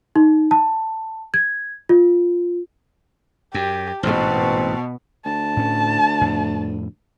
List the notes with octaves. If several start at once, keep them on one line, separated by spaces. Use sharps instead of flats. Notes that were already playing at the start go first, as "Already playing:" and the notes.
D#4
A5
G#6
F4
F#2 G4
A1 G#2 B2 C4 A5
D2 A5
A2 C#4
F2 A2